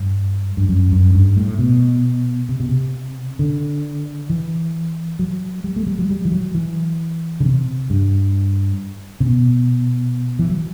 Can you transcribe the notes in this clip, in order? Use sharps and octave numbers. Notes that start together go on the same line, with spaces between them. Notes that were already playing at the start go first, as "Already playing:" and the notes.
Already playing: G2
G2
F#2
F#2
G2
A2
B2
C3
B2
C3
D3
E3
F#3
G3
A3
G3
F#3
G3
E3
F#3
E3
D3
C3
G2
C3
B2
E3
F#3